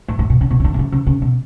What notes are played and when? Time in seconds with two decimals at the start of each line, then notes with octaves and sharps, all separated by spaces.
0.08 A2
0.19 A2
0.30 B2
0.41 C#3
0.50 B2
0.60 C#3
0.64 D3
0.74 B2
0.79 C#3
0.92 C#3
1.07 C#3
1.22 B2